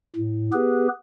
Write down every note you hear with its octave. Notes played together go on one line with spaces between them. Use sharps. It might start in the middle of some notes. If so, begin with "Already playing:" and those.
A2
B3 G4 G#4 B4